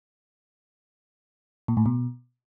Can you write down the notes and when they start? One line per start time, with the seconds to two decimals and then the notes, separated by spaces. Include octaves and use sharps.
1.68 A#2
1.77 A2
1.86 B2